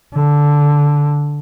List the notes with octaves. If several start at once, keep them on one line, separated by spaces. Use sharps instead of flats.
D3